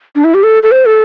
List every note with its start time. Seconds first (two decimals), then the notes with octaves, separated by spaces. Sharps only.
0.16 D4
0.24 E4
0.34 G4
0.43 A4
0.63 A4
0.71 C5
0.86 A4